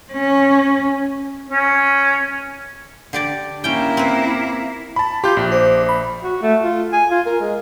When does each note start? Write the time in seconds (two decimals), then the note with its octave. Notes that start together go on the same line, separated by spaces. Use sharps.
0.13 C#4
1.51 C#4
3.13 D3 G4 D5
3.64 A#3 C#4 E4 G5
3.97 C4 B4
4.96 A5 B5
5.24 F4 G4 C6 G6
5.37 A#1
5.52 C5 D6
5.89 B5
6.24 F#4
6.42 A3
6.62 F4
6.93 G#5
7.10 F4
7.27 A#4
7.41 G#3